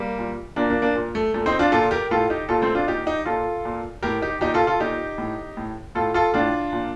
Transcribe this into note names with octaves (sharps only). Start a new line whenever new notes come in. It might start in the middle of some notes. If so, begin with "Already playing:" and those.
Already playing: G3 A#3
A#2
A#2 A#3 D4
A#3 D4
A#3 D4
A#2
A3
A#2 A3
C4 D#4
D4 F4
A#2 F4 A4
G4 A#4
A2 F4 A4
D#4 G4
A#2 F4 A4
A3 C4
D4 F4
A#2 D#4 G4
D#4 G4
A#2 F4 A4
A#2
A2 G4 A#4
D#4 G4
A#2 D#4 G4
F4 A4
F4 A4
A#2 D#4 G4
A2
A2
A2 F4 A4
F4 A4
A2 D4 F4
A#2